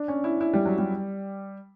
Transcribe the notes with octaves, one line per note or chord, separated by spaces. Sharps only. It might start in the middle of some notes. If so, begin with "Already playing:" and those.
Already playing: D4
C#4
E4
E4
G3
F#3
G3